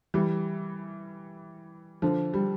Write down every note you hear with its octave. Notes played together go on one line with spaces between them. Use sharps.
E3 G3
D3 F3
G3